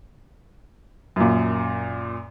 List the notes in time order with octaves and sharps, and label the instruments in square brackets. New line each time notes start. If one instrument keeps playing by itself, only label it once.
[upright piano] F#2 A#2